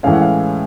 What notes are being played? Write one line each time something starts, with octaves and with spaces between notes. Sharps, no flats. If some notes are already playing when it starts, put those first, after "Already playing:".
A2 E3 G#3 C#4 F5
F#5
F5